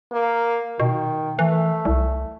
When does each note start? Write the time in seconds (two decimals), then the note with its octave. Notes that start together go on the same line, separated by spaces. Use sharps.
0.12 A#3
0.80 B2 D#3
1.39 E3 A3
1.85 C2